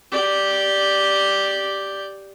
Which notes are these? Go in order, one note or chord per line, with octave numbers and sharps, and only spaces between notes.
G4 D5